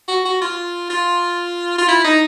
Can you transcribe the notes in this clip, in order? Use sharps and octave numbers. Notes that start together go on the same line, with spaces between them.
F#4
F#4
F4
F4
F4
E4
D#4